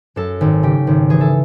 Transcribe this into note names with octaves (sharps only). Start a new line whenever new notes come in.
F#2 A4
G#1
C#3 G4
G#1
E3 G#4
A4